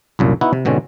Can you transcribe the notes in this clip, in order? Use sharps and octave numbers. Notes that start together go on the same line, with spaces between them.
C2 F#2 A#2
B3 D#4 E4 F#4 F#5
C3
G#2 B2 D3 C4 C#4